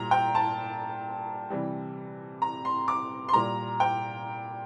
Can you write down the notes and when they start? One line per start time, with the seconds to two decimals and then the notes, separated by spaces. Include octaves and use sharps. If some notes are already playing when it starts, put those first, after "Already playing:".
Already playing: A#2 G3 A#5
0.11 G5
0.35 A5
1.50 C3 E3 G3
2.42 A#5
2.65 C6
2.88 D6
3.29 C6
3.33 A#2 G3 A#5
3.80 G5